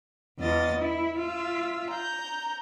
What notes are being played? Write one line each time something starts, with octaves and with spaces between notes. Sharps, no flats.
E2 F4 D#5 A6
E4
F4 E5
A#5 G6